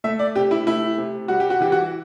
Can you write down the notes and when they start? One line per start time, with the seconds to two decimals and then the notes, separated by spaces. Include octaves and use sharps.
0.04 A3 E5
0.19 D5
0.36 C3 G4
0.51 E4
0.67 A3 E4
0.98 C3
1.28 G3 F#4
1.40 G4
1.50 F#4
1.61 E3 G4
1.72 F#4